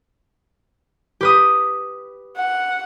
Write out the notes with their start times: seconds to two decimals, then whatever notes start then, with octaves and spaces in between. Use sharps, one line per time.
1.21 G4 B4 D#6
2.36 F#5